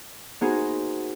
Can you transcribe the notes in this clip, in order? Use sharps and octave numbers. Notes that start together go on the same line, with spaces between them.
B3 D#4 F#4 G#4 A#4 C5